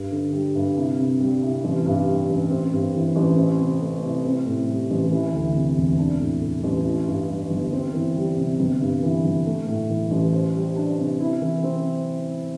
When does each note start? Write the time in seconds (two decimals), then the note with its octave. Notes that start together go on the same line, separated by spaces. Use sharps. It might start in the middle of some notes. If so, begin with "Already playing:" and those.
Already playing: G2
0.11 D3
0.33 G3
0.55 G2
0.76 C2
0.99 C3
1.20 G3
1.42 C2
1.64 A1
1.86 G2
2.08 G3
2.29 A1
2.50 C4
2.72 G2
2.94 E3
3.16 A1
3.37 C4
3.59 C3
3.81 A3
4.03 C2
4.24 C4
4.46 A2
4.68 G3
4.90 A1
5.11 E3
5.33 D2
5.55 C3
5.76 E1
5.99 D4
6.20 A2
6.41 A3
6.63 A1
6.85 E4
7.07 G2
7.29 G3
7.50 G1
7.72 C4
7.94 E3
8.16 G3
8.37 C3
8.59 G1
8.81 G2
9.03 E3
9.24 G1
9.46 A3
9.68 A2
9.90 E3
10.11 A1
10.33 C5
10.54 G3
10.76 D4
10.98 C3
11.20 E4
11.41 E3
11.63 C4